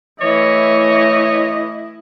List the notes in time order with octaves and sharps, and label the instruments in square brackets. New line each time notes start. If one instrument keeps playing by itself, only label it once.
[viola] E3 A3 [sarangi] E4 [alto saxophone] C#5 [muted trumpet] D#5